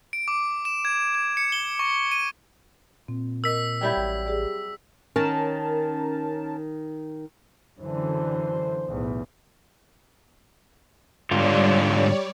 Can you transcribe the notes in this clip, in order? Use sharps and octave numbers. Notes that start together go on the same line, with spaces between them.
D7
D6
E7
G#6
G#6
C#7
G7
C#6
D#7
A#2 C4
A#4 D#5 E6 B6
F#3 G3 E4 G5 G6
A1
G4 G#4 D5
D#3 C#4 A#4 A5
F#2 D3 E3 C5
B1 E2 A2
G#2 D3 G3 F4 C#5 D5